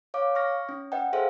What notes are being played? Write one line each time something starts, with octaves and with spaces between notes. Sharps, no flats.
C#5 F5 D6
C#6 F6 A#6
C#4
B4 D#5 F#5 G5
G#4 A4 C5 E5 F5